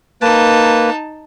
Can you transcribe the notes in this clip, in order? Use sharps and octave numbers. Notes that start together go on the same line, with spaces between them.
A#3 D#4 B4 A5